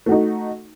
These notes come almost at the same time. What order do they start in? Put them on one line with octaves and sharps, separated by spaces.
A3 F#4 D#4